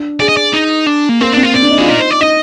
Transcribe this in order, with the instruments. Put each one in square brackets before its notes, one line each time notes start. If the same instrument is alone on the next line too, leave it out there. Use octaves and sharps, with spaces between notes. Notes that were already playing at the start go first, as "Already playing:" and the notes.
Already playing: [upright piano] D4
[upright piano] G#4 [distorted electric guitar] D5
[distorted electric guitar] D#5
D5
D#4
D4
A#3
[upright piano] A#3 [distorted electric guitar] C4
[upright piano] C4 [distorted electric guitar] D4
[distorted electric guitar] F4
[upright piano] C4 [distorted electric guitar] D5
[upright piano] D4
D#4
[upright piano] F4 [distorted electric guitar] G#4
[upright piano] D#4 [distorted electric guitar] A#4
[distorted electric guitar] C5
D5
[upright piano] D#4 [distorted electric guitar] D#5